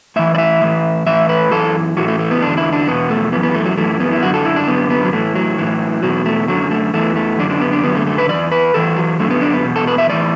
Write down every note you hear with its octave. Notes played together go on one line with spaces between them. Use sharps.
A2 E3 E5
D5
E5
A2 E3
A2 E3 E5
B4
F#2 E3 A4
A2 E3 F#4
A3
A3
B3
E2 D3 D4
E4
D4
E2 B2 B3
A3
F#2 E3 B3
B3
A3
F#3
F#2 E3 A3
B3
E4
F#2 D3 F#4
A4
E4
D4
F#2 D3 B3
B3
F#3
A2 E3 A3
F#3
A2 E3
E2 B2 F#3
A3
F#2 D3 F#3
A3
E2 E3 A3
A3
F#2 D3 D4
D4
B3
D4
F#2 D3 B3
A3
A3
B4
E2 E3 D5
B4
E2 E3 A4
F#3
F#2 D3 A3
B3
D4
B3
E2 B2
A4
B4
E5
A2 E3 D5